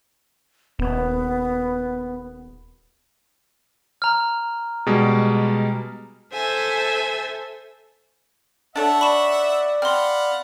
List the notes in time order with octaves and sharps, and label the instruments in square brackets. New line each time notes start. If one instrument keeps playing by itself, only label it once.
[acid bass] D#1 [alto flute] B3
[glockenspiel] A#5 F6
[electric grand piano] B2 G3 G#3
[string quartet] A4 C5 E5 G#5
[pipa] D4 A4 C#5 [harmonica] E5 F#5
[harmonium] D5 [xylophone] B5 C#6 E7
[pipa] C4 [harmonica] F5 F#5 B5 [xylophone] C6 F6